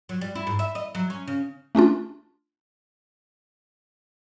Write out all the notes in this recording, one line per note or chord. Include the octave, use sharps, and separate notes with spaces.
F#3
G3
E4
G#2
E5
D#5
F#3
C#4
C#3
A3 C#4 D4 F4